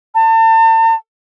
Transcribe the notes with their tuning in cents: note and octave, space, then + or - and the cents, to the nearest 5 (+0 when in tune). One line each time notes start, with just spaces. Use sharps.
A5 +40